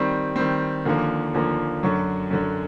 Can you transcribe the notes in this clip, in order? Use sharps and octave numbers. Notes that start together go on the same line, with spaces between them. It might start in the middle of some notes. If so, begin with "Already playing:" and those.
Already playing: D#3 G3 C4
D#3 G3 C4
D#2 D3 F3 A#3
D#2 D3 F3 A#3
F#2 D3 F#3
F#2 D3 F#3